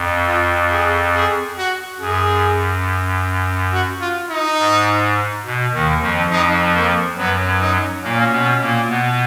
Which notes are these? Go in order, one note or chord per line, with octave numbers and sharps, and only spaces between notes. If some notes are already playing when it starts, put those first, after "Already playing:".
Already playing: F2
F4
G#4
G#4
F#4
F#2 G#4
F#4
F4
D#4
G#2
B2
D#2 D#3
F2 F3
F2 F3 D#4
A#3
F#2 F#3 B3
D#4
A#2 A#3 C#4
B2 B3
A#2 A#3
B2 B3